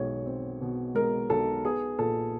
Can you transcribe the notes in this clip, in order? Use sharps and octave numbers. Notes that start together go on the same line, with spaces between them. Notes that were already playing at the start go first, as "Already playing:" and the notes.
Already playing: B1 B2 G#3 C#5
C4
B2
G#3 A#4
B1 A4
B3 G#4
A#2 A4